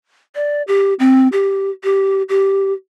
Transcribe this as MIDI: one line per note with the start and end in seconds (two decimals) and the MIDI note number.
0.35 0.62 74
0.68 0.94 67
0.99 1.28 60
1.32 1.70 67
1.84 2.23 67
2.29 2.73 67